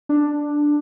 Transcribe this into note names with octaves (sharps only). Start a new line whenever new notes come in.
D4